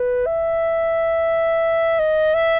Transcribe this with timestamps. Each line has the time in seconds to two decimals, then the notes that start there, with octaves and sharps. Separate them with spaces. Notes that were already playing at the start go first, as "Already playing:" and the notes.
Already playing: B4
0.27 E5
1.99 D#5
2.34 E5